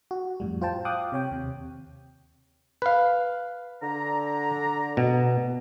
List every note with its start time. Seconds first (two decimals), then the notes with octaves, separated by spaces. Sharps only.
0.11 F#4
0.40 F2 A2 G3
0.62 F4 C5 G5 A5
0.85 F5 G5 D6 D#6 F#6
1.12 C3 C#5 G5
1.31 D#2 C3
2.82 B4 F5
3.83 D3 A#5
4.97 B2